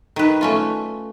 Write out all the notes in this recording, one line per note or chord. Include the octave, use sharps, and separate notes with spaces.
D#3 B4
A3 C#4 F4